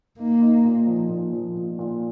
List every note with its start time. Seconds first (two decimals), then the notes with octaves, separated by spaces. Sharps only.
0.19 A#3 D#4
0.42 D#4
0.64 A#2
0.87 F3
1.09 A#2
1.33 F3
1.55 A#2
1.79 A#2